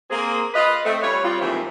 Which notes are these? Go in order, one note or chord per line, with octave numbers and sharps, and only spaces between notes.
A#3 C4 G#4
F4 B4 D#5
A3 C4
G3 F4 B4 C#5
G3 C4 F4
D#2 G#2 C3 E3 F3 C4